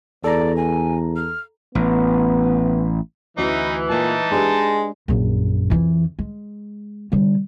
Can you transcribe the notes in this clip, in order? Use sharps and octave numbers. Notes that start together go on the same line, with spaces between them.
E2 A4 D5 A#5
G#5
F6
A1 B3
D2 E3 C#4 D#4 F#4
A#2 G#3 D#4 A5
G#3 D4 G4 B4
A#1 F#2
F2 E3
G#3
D3 G3